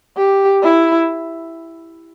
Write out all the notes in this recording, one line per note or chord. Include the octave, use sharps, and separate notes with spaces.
G4
E4